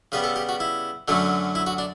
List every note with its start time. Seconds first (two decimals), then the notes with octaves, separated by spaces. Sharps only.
0.12 C#3 G3 B3 B4
0.24 A4
0.36 G4
0.49 F#4
0.60 E4
1.08 F#2 D3 F#3 A3 C#4
1.55 E4
1.67 F#4
1.78 D4